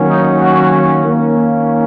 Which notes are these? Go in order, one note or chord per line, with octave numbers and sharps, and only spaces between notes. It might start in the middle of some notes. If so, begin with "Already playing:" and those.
Already playing: D#3 F#3 A#3 C#4
D#4
F#4
D#3 A#3 C#4